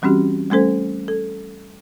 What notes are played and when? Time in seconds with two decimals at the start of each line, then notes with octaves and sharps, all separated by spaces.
0.02 E3 G3 C4 C#4 F#4 G4
0.51 G3 A3 C#4 A4 C5
1.08 A4